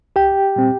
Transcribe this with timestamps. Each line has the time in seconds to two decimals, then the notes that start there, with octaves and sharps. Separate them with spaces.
0.16 C2 G4 G5
0.56 A#2 G3 C4